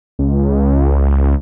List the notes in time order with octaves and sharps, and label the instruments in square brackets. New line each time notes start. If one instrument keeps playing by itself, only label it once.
[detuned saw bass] C#2